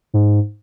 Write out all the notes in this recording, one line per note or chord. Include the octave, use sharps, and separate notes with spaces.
G#2